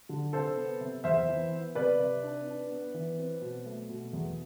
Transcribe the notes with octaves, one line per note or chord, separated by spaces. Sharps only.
D3
C3 A4 C5
B3
C3
E2 C5 E5
E3
B3
C3 B4 D5
C3
D4
D4
B3
E3
C4
B2
A3
B2
E2